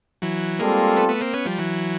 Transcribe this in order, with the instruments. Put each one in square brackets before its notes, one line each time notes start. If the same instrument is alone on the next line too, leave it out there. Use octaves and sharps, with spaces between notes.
[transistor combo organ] E3 F#3
[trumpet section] G3 C4 F4 A4 [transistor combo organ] G#3 A#3
[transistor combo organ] A3 B3
A3 B3
A#3 C4
B3 C#4
F3 G3
E3 F#3